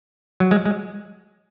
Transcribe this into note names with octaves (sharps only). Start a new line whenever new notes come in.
F#3
G#3
G#3